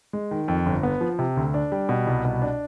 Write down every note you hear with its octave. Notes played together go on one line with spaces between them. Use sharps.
G#3
D#3
F2
G1
B3
F3
C3
D2
D4
G3
B2
C2
B2
D4